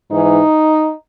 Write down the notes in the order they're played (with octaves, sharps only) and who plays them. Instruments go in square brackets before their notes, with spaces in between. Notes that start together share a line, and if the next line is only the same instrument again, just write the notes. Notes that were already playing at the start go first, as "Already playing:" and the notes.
[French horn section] G#2 E3 D#4